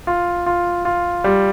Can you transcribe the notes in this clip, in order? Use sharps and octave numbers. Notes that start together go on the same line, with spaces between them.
F4
F4
F4
G3